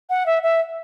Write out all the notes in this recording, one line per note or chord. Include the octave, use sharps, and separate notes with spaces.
F#5
E5
E5